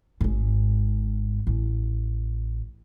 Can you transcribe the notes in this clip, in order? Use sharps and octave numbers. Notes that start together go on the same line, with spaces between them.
G#1 G#2
A1